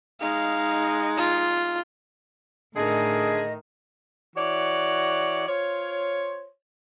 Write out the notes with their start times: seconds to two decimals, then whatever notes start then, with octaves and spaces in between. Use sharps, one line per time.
0.21 G#3 D#4 F5
1.17 F4
2.76 A2 D3 D#3 G#4 D#5
4.35 E3 F#4 C#5 D5
5.47 F4 C5 C#5